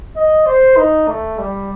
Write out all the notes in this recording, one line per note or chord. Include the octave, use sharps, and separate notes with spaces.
D#5
C5
D#4
A3
G3